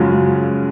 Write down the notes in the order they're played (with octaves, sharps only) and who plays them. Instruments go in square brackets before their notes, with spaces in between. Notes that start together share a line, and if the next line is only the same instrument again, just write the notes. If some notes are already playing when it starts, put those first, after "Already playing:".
Already playing: [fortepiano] F#2 C#3 F3 G#3